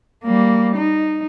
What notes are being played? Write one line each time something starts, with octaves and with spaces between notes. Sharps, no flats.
G3 A#3
D#4